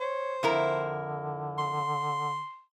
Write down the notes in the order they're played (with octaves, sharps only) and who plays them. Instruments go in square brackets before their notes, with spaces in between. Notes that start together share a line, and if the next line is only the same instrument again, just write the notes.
[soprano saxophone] C5 [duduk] C#5
[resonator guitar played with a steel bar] F2 E4 A#4 [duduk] D3
[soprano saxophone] C6